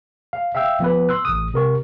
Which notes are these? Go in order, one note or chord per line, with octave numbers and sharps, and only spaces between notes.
F5
E5 F5 G5 E6
F3 B3 B4
C6 E6 F#6
A1 D#6
C3 A#4 C#6